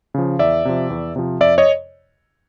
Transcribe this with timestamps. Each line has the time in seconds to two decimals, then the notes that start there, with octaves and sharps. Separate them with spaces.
0.14 C#3 F3
0.39 E2 D5 E5
0.65 C3 F3
0.90 E2
1.16 C3 F3
1.40 F2 D5 E5
1.58 C#5 D#5